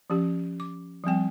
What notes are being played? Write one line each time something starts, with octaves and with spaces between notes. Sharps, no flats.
F3 C#4 G4
D6
F3 G3 C4 G5